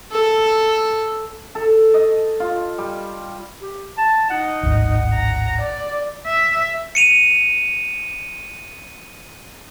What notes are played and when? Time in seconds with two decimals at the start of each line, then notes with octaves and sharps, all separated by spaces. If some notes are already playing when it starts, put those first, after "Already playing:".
0.11 A4
1.55 A4
1.94 D#5
2.40 F4
2.78 G3
3.62 G4
3.98 A5
4.30 D#4 F#5
4.63 D1 G#1
5.14 A#5
5.61 D5
6.27 E5
6.95 C#7 D#7 F7